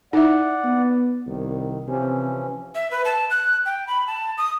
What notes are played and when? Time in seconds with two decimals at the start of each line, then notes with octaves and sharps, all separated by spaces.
0.13 D#4 E4 D5 E5 F#5
0.64 B3
1.27 C2 D#3
1.88 C3 E3 F3 C#4
2.75 E5
2.91 B4
3.05 A5
3.30 F#6
3.66 G5
3.87 B5
4.07 A5
4.38 D#6